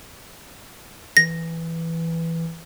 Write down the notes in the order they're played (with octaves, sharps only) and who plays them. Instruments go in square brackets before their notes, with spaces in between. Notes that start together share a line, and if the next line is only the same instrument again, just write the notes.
[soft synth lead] E3 [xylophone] A#6